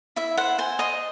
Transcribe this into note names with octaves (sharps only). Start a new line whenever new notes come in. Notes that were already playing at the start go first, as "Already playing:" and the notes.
E4 E5
C5 F#5
C5 G#5
D#5 C6